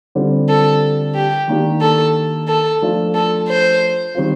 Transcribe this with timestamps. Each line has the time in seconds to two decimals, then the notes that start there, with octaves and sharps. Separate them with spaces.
0.15 D3 G3 C4 F4
0.49 A4
1.15 G4
1.48 D#3 A#3 D4 G4
1.81 A4
2.48 A4
2.82 F3 A3 D4 F4
3.14 A4
3.48 C5
4.15 D#3 G3 C4 F4